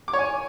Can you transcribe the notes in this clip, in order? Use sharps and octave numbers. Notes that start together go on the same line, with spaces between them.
D6
C#5
G#5